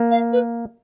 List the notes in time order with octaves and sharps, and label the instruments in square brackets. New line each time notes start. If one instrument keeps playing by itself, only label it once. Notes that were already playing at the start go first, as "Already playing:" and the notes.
Already playing: [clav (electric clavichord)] A#3
[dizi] F5
B4